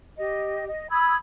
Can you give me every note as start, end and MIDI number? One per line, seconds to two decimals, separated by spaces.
0.18 0.67 67
0.18 0.67 75
0.68 0.88 75
0.91 1.16 83
0.91 1.16 87
0.91 1.16 88
0.91 1.16 92